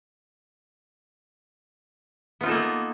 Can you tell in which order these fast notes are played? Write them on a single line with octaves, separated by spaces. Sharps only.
B3 F4 D#4 A4 A#3